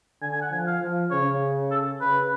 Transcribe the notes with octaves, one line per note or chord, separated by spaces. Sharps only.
D3 G#5
G#5
F#5
F3 G#5
F5
F3
C#3 C#5
A4
C#3 B4